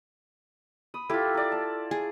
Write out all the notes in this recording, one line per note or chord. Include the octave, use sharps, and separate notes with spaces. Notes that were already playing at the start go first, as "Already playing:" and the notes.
B5 D#6
E4 F4 G4 A4 B6
A#4 D5
D5 A5
G#4